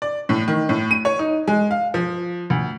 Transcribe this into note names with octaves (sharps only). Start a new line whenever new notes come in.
D5
A2
D#3
A2
D#7
C#5
D#4
G#3
F5
F3
D2